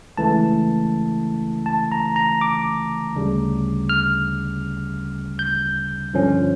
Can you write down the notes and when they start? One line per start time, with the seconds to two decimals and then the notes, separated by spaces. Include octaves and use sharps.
0.17 C#2 C#3 E3 A3 A5
1.66 A5
1.92 A#5
2.16 A#5
2.41 D6
3.16 D2 C#3 G3
3.89 F6
5.39 G6
6.14 G2 D3 F3 C#4